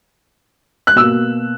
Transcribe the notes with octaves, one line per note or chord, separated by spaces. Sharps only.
F#6
B2 A#3 E6